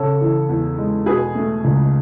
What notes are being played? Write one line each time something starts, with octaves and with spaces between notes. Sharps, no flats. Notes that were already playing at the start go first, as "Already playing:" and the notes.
Already playing: C#3 A4 C#5
E3
E2
G#3
B2 G#4 B4
A3
C#2